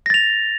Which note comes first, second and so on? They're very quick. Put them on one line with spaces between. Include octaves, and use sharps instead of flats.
A#6 A6 F7